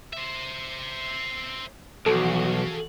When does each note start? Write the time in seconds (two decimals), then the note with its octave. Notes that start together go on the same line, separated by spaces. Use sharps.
0.13 C5 E5
2.06 B1 E3 F3 F#4 G#4 A4 F5